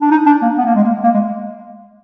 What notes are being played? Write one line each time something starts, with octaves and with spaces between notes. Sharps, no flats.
D4
D#4
D4
A#3
B3
A#3
G#3
A#3
A#3
G#3